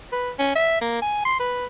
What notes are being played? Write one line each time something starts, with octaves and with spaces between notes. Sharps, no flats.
B4
C#4
E5
A#3
G#5
C6
B4